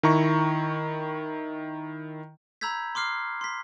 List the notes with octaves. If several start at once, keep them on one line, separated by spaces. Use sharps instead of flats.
D#3 E4 A#5 C#6
A#5 B5 E6 G6 G#6 B6
C6 D6 F6 C7
C6 B6